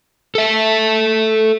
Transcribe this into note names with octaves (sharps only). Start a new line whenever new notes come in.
A4 E5